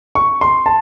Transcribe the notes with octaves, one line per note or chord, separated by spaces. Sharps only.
C#6
C6
A5